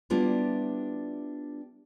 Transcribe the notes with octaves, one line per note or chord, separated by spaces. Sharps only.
G3 B3 D4 E4 F4